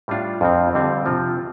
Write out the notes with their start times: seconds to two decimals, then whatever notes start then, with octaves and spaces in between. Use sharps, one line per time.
0.08 A2 G3 D4 F4
0.41 F2 F3 C4
0.73 F2 D3 G3 C4
1.06 C3 F3 C4 F4